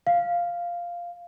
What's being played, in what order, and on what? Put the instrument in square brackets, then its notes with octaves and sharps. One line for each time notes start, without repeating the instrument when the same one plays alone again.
[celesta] F5